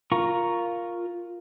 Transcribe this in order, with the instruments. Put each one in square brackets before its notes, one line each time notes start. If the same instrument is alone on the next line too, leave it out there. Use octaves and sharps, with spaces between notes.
[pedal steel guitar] F4 A#4 A#5 C#6